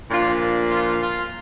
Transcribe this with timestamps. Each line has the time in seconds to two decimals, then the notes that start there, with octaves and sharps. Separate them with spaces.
0.11 A#2 F3 D4 F4
0.70 F4
1.00 F4